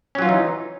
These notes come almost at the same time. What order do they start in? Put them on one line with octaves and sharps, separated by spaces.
C#4 F#3 F4 E3 D#4